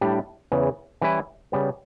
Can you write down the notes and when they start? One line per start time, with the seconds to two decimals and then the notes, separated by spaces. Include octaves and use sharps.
0.01 A2 G3 D4 G4
0.52 E2 C#3 E3
1.01 E3 G3 C#4 E4 B4
1.52 C#3 G3 B3